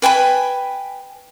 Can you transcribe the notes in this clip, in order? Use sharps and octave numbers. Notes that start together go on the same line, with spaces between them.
B4 G5 G#5 B5